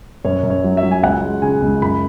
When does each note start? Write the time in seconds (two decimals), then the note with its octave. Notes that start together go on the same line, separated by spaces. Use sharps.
0.25 F#2 C#5
0.43 F#2
0.50 C#5
0.64 F#3
0.77 E5
0.83 F#3
0.91 G#5
1.03 C#2 F#5
1.22 G#3
1.42 C#3 G#5
1.62 C#2
1.82 F#2 B5